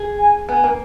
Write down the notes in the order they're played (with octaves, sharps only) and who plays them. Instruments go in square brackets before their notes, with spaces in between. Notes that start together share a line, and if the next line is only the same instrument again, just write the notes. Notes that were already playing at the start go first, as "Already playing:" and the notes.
Already playing: [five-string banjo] G#4
[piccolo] G#5
[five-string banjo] B3 [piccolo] G#5
[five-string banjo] A#3